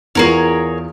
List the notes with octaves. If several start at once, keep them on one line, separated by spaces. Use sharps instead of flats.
E2 E3 F4 G#4 A#4 C#5